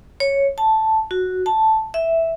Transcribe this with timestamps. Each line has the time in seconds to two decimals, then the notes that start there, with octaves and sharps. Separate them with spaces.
0.20 C#5
0.58 A5
1.11 F#4
1.46 A5
1.94 E5